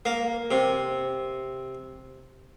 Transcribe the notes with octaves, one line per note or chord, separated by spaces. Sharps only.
A#3
C3